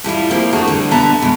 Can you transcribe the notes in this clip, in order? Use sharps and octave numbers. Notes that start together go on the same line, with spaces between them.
A2 G3 E4 F4
F3 G3 A#3 C4 D#4
A3 A#3 D4 F#4 G#4 A#4
D3 G3
B2 D3 B3 E5 A5 A#5
B2 G#3